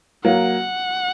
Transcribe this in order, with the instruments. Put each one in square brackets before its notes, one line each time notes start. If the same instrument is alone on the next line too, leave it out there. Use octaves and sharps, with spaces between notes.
[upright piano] F#3 A#3 [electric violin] F#5